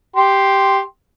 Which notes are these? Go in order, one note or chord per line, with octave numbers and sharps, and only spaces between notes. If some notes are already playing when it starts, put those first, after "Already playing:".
G4 C6